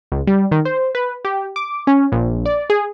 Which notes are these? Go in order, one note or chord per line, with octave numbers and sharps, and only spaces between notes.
C#2
G3
D#3
C5
B4
G4
D6
C#4
A#1
D5
G#4